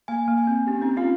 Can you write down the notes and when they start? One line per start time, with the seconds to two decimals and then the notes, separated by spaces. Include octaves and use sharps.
0.08 A#3 G#5
0.28 A#3
0.38 G#5
0.47 C4
0.67 C#4 G4
0.81 C4 D#4
0.97 C#4 F4 F5